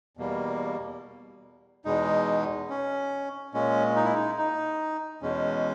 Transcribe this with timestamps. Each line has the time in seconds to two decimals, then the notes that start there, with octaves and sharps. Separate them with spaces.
0.17 E2 B2 G3 A#3
1.85 E2 B2 G#3 D#4
2.70 C#4
3.54 A#2 G#3 C#4
3.96 D#4
4.05 E4
4.15 D#4
4.38 D#4
5.22 E2 B2 G#3 C#4